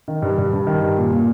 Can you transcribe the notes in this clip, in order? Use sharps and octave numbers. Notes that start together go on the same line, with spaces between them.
D#3
G2
G2
G2
D#3
G2
A#2
A#2